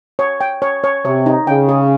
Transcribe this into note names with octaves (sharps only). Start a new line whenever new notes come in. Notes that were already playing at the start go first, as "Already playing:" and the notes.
C#5
G5
C#5
C#5
C3 C#5
D#4
C#3 G5
G#4